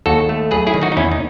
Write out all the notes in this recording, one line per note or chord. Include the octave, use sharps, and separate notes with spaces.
D#2 F#4 A4
A3
F#3 G#4 B4
E4 G#4
D#3
D#4 F#4
D#4
E2 C#4 E4
D#4